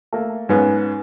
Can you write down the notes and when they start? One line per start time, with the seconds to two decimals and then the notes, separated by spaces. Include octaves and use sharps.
0.13 A3 A#3
0.49 G#2 B3 C#4